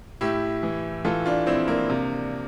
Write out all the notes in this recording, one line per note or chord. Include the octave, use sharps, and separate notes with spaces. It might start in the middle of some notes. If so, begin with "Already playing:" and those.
A2 E4 G4
E3
E3 F4 A4
D4 F4
A#1 C4 E4
A#3 D4
C3